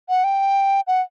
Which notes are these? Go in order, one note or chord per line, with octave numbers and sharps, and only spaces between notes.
F#5
G5
F#5